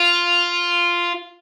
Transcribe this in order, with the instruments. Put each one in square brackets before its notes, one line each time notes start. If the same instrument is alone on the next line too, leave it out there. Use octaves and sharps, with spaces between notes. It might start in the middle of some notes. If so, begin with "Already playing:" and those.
Already playing: [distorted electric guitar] F4